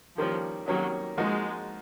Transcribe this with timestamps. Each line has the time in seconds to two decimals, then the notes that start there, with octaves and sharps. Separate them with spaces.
0.18 D#3 F3 G3 A#3 C#4
0.68 D#3 F#3 G3 A#3 C#4
1.17 F3 G#3 A#3 D#4 F#4